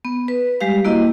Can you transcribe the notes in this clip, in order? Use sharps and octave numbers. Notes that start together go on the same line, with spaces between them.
B3
B4
G3 G#3 G4 F5
A#3 E4 F#4 D#5